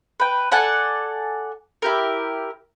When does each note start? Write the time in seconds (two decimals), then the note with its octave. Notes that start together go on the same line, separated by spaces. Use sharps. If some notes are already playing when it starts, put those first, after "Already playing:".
0.20 B4 G5
0.51 A4 D5 F#5 G#5
1.82 E4 G4 A#4